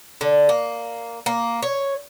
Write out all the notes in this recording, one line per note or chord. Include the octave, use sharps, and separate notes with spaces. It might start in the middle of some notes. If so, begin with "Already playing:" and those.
D3
A#3
A#3
C#5